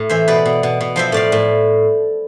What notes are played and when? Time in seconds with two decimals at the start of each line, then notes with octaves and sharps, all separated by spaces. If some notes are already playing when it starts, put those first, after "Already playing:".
Already playing: A2
0.09 E3 C5 E5
0.28 B2 B4 D5
0.46 B2
0.63 B2
0.81 B2
0.96 F3 C5 E5
1.12 A2 D5 F5
1.32 A2